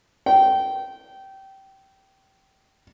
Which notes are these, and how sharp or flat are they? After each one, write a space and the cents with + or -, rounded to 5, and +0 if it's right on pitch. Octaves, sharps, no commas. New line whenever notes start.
G5 -20